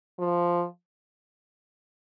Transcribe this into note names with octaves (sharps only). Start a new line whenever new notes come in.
F3